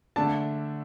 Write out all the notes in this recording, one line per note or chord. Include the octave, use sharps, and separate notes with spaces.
D3 A3 D4 A5